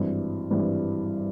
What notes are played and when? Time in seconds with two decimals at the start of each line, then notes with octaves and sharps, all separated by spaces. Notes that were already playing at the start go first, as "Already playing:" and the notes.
Already playing: G#1 G2 E3
0.51 G#1 G2 E3